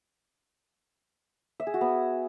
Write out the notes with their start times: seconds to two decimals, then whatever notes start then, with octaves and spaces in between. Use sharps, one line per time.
1.60 E5
1.67 G#4
1.74 F#4
1.81 B3